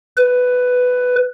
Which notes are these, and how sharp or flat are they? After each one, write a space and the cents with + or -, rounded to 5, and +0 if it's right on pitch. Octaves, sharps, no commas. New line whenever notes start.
B4 +10